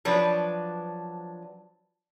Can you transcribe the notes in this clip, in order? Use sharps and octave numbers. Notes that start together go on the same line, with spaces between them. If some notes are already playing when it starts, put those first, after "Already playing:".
F3 F#3 D4 B4